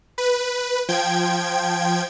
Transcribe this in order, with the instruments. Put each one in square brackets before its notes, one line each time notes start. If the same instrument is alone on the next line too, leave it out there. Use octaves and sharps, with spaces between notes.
[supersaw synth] B4
F3 G5 G#6